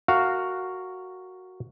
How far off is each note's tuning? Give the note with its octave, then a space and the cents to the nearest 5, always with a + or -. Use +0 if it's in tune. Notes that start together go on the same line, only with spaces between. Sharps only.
F#4 +0 A#4 -20 F5 +0